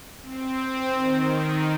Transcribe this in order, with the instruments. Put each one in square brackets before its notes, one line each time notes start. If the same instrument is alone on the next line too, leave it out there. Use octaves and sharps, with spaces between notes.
[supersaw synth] C4
D#3